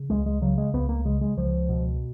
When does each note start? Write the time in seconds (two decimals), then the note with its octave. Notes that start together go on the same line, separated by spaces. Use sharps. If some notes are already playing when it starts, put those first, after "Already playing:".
Already playing: C#3
0.10 C#2 G#3
0.26 G#3
0.42 C#3 F#3
0.58 G#3
0.73 C#2 B3
0.89 A#3
1.05 C#3 G#3
1.21 G#3
1.37 C#2 F3
1.69 B2